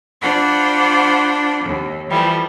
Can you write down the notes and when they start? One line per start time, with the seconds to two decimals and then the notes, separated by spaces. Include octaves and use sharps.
0.22 D4 F4 C5 D5 F#5 B5
1.66 D#2
2.10 E3 F3 G3 A3